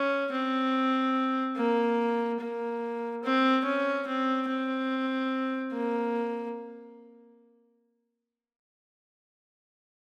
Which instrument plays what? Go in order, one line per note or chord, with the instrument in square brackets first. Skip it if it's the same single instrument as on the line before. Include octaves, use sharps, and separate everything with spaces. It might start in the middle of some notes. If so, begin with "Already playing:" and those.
Already playing: [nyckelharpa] C#4
C4
A#3
A#3
C4
C#4
C4
C4
A#3